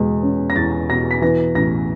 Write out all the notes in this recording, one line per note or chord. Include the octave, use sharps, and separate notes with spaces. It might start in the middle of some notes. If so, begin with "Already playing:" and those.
Already playing: E2 B2 G#3
C#4
A#6
E2 A6
B2 A#6
B6
E3 A#6
A1 A#6